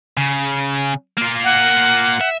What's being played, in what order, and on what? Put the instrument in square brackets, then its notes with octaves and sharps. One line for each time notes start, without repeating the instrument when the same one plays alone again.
[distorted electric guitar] C#3
A#3 F4
[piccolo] F#5
[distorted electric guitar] E5